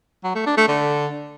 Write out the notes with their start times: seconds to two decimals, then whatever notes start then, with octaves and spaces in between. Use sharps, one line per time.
0.24 F#3
0.35 A3
0.46 D4
0.57 A3
0.68 D3